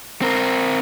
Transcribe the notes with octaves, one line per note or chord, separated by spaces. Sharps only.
C4 A#4